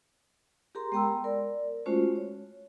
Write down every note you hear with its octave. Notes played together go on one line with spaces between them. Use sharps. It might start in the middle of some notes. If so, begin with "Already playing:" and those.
G4 G#4 A#4 A#5 C6
G#3 B3 G5 A#5 C6 E6
A#4 D5
G#3 A3 C#4 F4 F#4 C5
C#5